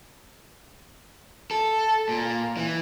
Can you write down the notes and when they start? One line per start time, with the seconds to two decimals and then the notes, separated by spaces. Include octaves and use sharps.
1.51 A4
2.09 A#2
2.57 E3